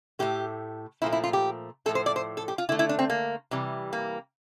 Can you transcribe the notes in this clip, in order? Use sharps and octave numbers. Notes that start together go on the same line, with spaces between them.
A2 E3 A3 G4
A#2 F3 A3 E4
E4
F4
G4
A2 F3 A3 A4
C5
D5
C5
A4
G4
F4
D3 A3 E4
E4
D4
C4
A#3
C3 E3 G3
A#3